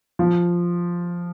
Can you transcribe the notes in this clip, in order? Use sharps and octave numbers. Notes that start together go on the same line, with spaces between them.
F3